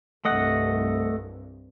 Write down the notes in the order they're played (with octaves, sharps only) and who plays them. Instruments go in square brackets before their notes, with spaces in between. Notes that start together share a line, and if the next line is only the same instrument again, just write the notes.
[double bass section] C2 G2 [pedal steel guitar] A3 D#5 F#5